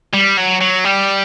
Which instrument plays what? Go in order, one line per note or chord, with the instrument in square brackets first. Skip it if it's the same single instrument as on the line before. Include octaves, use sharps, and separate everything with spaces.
[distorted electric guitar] G3
F#3
F#3
G3